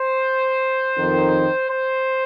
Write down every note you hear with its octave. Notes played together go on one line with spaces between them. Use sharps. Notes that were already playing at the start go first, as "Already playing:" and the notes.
Already playing: C5
F2 D#3
C5